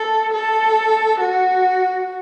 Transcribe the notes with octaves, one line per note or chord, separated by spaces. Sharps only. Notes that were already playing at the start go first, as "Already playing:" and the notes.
Already playing: A4
A4
F#4